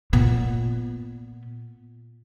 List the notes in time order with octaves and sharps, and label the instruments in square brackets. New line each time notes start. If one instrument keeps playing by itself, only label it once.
[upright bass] A#2 B3